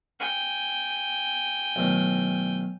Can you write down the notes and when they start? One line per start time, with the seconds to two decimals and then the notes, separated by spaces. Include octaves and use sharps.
0.20 G5 G#5
1.76 B1 A2 D#3